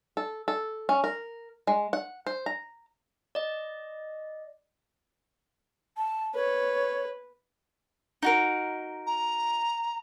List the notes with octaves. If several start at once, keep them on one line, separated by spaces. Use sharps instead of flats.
A4
A4
C#4
A#4
G#3
F#5
C5
A#5
D5 D#5
A5
B4 C#5
D#4 F#4 A#4
A#5